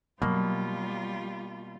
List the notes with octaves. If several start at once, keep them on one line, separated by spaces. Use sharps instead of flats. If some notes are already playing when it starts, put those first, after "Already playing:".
B2 F#3 G3 A#3 F4